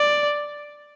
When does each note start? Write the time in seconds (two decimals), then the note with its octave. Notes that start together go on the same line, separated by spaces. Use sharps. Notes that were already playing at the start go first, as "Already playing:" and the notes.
Already playing: D5